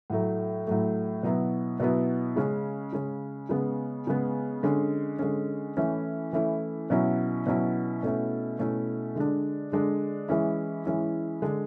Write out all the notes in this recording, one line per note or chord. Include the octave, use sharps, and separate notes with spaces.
A2 F#3 A3
A2 F#3 A3
B2 F#3 B3 E4
B2 F#3 B3 E4
C#3 G#3 C#4
C#3 G#3 C#4
C#3 G#3 B3
C#3 G#3 B3
D3 G#3 C#4
D3 G#3 C#4
E3 A3 C#4 E4
E3 A3 C#4 E4
B2 F#3 C#4 E4
B2 F#3 C#4 E4
B2 A3 C#4 E4
B2 A3 C#4 E4
D3 G#3 D4
D3 G#3 D4
E3 G#3 C#4 E4
E3 G#3 C#4 E4
D3 G#3 D4